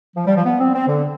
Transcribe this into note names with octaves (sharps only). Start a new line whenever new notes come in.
F3
G3
F3
B3
C4
C4
D3